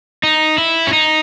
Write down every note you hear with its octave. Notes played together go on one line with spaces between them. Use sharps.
D#4
E4
C#4
D#4